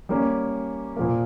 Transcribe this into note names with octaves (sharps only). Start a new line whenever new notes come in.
G3 A#3 C#4
A#2 F3 A#3